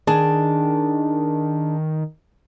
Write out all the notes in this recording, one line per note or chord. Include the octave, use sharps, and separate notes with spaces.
D#3 D4 G#4 A5